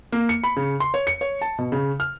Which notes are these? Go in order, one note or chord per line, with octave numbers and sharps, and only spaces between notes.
A#3
C#7
B5
C#3
C6
C#5
C#7
C#5
A5
B2
C#3
F6